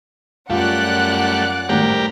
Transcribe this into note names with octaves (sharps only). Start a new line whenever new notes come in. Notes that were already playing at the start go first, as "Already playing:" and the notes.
F#2 G3 A3 F4 D5 F#5 F#6
G#1 A2 G3 G4 A#4